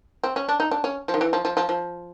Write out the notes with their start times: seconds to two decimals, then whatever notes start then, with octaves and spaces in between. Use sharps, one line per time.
0.24 C4
0.36 C#4
0.49 D4
0.60 D#4
0.71 D4
0.84 C#4
1.08 F3
1.14 D#3
1.21 E3
1.33 F3
1.45 F3
1.57 F3
1.69 F3